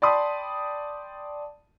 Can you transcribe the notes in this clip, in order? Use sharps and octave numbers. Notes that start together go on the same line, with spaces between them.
D5 G5 A5 B5 C6 D#6